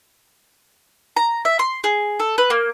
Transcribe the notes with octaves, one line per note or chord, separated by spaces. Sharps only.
A#5
E5
C6
G#4
A4
B4
A#3